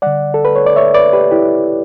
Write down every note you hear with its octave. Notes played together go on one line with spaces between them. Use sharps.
D3 G3 D5 F#5
A4
B4
C#5
D5
C#5 E5
B4 D5
G4 B4
E4 G4